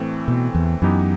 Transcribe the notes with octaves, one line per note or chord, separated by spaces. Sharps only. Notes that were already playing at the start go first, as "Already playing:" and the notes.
Already playing: A2 E3 A3 C4
B2
E2
F#2 E3 B3 D#4 G4